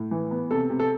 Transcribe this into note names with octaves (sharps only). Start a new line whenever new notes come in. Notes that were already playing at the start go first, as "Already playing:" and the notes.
Already playing: A2
E3
B3
C3 A4
C3
A4